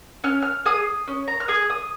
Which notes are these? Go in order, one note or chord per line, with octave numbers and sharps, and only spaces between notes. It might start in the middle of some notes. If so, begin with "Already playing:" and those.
C#4 F6
F6
G#4 D#6
C#4
A#5
F6
G#4 D#6
D#6